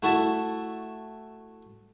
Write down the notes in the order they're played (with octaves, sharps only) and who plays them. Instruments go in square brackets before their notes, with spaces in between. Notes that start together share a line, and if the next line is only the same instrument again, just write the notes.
[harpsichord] A3 E4 F#4 E5 A5